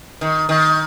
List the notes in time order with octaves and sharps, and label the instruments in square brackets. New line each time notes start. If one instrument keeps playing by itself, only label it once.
[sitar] D#3
D#3